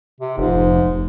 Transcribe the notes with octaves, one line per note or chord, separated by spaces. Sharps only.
C3
F1 G#2